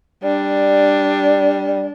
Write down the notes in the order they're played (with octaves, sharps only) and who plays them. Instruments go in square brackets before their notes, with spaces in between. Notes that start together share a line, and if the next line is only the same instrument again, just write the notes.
[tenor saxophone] G3 [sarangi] D4